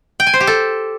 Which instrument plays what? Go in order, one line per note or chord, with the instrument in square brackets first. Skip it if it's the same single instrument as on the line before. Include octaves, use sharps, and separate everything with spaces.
[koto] G5
G#5
C5
G4
A4